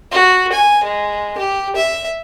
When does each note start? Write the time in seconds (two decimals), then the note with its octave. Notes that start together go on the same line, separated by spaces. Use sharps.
0.12 F#4
0.53 G#5
0.84 G#3
1.38 G4
1.76 E5